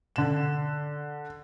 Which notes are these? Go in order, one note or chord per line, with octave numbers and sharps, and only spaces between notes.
D3 E7